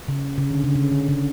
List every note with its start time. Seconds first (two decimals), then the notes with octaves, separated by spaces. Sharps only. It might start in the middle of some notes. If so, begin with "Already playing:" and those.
0.08 C#3
0.38 C#3
0.51 D3
0.64 C#3
0.76 C#3
0.92 D3
1.09 C#3